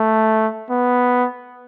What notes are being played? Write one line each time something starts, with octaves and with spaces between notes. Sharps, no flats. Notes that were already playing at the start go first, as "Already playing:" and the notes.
Already playing: A3
B3